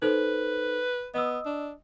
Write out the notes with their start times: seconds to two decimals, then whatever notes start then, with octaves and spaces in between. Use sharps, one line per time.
0.02 D#4 A4 B4 C5
1.14 B3 D#5 D#6 E6
1.45 D4